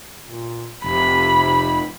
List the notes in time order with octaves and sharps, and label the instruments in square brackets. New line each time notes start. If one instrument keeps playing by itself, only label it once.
[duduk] A#2
[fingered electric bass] F1 [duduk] C3 [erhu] B5